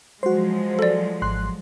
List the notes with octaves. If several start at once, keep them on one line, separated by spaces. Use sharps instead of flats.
F3 F#3 G#3 F#4 C5
A4 D5
G#1 C6 F#6